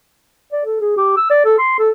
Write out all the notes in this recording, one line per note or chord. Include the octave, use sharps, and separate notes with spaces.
D5
A4
G#4
G4
E6
D5
A4
C6
A4